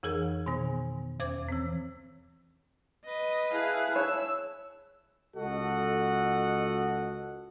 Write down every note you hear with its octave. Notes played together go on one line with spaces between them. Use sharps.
F2 E3 G#4 A#4 G#6
B2 D#3 B3
E2 C5 D6 G#6
E3 C4
B4 D#5
E4 G#4 F5 A5 F#6
C#5 E6
C#2 F#4 A4 D#5 F#5